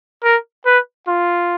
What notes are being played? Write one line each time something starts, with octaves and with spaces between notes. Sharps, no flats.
A#4
B4
F4